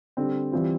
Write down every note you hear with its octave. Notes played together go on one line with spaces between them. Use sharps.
D3 G3 C4
E3 G3 C4 F4